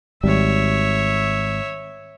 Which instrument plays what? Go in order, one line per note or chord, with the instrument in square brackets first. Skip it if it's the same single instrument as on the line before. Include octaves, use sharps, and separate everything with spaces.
[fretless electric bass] G#1 G3 [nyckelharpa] C#5 E5